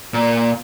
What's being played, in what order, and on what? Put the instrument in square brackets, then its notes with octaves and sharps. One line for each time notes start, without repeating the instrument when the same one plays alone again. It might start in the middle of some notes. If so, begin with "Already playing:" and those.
[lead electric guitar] A#2